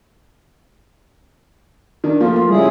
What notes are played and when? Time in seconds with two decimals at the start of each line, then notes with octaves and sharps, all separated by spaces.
2.04 D#3 D4
2.21 F3 A3 A#3 F4
2.36 F4 A#4
2.50 C#3 G3 E4 G#4